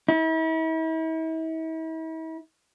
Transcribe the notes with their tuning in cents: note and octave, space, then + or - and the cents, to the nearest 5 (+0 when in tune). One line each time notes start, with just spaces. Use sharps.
E4 -40